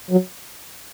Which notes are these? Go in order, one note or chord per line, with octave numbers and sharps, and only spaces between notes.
F#3